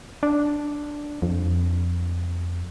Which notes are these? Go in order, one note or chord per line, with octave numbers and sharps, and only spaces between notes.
D4
F2